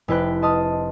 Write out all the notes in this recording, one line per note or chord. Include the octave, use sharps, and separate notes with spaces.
F1 E4 B4 C5 G5 F#6
D#5 A5 C6 D#6 F6